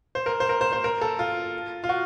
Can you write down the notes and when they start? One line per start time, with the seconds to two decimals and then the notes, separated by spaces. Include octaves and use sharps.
0.15 C5
0.26 A#4
0.40 C5
0.49 A#4
0.61 C5
0.73 C5
0.84 A#4
1.01 A4
1.19 F4
1.84 F4
1.89 F#4